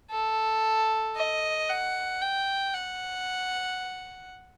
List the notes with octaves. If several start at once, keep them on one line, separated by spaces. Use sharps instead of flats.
A4
D#5
F#5
G5
F#5